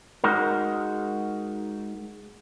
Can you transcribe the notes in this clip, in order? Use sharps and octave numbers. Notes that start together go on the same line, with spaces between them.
G#3 D#4 F#4 A#4